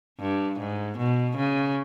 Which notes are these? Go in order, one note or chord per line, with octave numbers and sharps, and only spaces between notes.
G2
G#2
B2
C#3